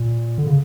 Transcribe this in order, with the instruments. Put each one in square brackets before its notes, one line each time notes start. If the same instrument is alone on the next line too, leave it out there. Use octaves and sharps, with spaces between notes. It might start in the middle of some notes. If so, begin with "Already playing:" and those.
Already playing: [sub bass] A#2
D3
C#3